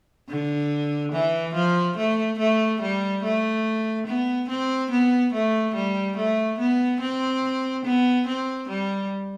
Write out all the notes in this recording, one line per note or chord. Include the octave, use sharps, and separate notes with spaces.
D3
E3
F3
A3
A3
G3
A3
B3
C4
B3
A3
G3
A3
B3
C4
B3
C4
G3